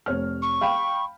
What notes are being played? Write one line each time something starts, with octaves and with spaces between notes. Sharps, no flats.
F1 C#5 F6
C#6
F5 G5 B5